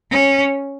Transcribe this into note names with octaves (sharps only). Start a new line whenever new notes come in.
C#4